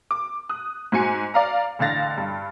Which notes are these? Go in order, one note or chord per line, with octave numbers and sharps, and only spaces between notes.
D6
D#6 F#6
G#2 F#4 G#5 C#7
D5 F5 A#5
A1 D3 F5 A6 A#6
G2